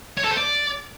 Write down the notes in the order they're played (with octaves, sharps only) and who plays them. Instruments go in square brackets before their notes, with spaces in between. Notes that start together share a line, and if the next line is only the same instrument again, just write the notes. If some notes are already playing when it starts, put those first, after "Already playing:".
[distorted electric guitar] C#5
A4
C5
D5